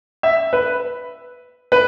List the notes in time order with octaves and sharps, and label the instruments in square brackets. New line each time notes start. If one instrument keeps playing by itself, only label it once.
[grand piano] E5
B4
B4